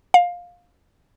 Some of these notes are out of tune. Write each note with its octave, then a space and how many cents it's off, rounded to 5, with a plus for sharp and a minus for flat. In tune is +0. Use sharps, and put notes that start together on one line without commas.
F5 +15